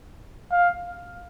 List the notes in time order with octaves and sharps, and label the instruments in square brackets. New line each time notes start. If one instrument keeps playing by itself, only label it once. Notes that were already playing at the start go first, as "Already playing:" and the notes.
[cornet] F5